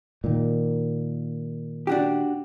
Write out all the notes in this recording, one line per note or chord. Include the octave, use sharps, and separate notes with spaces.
A#2 D#3
D4 F#4 G4